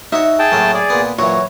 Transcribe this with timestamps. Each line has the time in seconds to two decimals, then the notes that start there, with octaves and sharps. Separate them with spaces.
0.12 D#4 F#4 C#5 E5
0.39 G#4 G5 A5
0.52 A2 F#3 A#3
0.74 G#4 D5
0.90 A#2 B3
1.18 A#2 E3 F#3 F#4 C#5